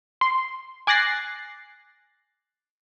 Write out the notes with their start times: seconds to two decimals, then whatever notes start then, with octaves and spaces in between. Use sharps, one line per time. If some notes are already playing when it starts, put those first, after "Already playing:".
0.21 C6
0.87 G#5 D6 F#6 A6 A#6 C7